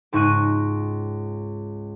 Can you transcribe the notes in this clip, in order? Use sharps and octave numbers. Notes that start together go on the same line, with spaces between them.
C#2 G#2 D#4 C#6 F#6 D#7